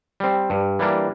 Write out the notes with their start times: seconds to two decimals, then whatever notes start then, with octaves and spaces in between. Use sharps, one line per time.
0.20 G3 C4
0.50 G2
0.79 E3 G3 A#3 D4